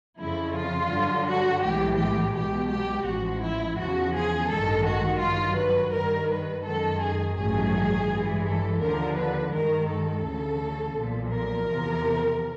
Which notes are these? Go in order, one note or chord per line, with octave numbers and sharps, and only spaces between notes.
F2 C#3 F3 E4
F4
G2 D3 F#3
F#4
B1 A2 E3 G#3 G4
G4
B1 B2 G#3 G4
G4
A1 G#2 F3 F#4
E4
E2 C#3 F3 F#4
G#4
A1 G2 D#3 G#3 A4
F#4
G2 D#3 F#3 F4
B4
G2 D#3 G3 A#4
B4
F#2 D#3 G#3 A4
G#4
A1 G2 D#3 F#3 A3 G#4
G2 E3 G#3
A4
D#2 D3 F3 A#4
B4
G2 D#3 G#3 A#4
A4
D2 C#3 E3
B1 A#2 F3
A#4
E2 C3 F3